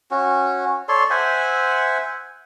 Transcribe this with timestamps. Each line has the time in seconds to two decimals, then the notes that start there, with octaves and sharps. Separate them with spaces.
0.11 C#4 F#4
0.89 A4 C#5 D5 C6
1.10 C5 E5 F#5 G#5